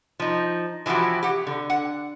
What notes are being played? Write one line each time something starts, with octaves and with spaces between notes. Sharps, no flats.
F3 D#4
E3 F3 E4 F#4 G4
G4 F#5
D3
F#5